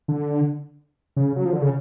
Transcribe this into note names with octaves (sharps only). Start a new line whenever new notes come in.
D3
C#3
F#3
F3
D3
C#3